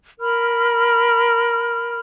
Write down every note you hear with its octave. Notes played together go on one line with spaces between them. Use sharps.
A#4 B5 F6